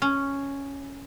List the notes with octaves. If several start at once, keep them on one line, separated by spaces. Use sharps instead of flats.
C#4